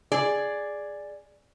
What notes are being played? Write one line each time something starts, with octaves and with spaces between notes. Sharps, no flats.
G#4 D5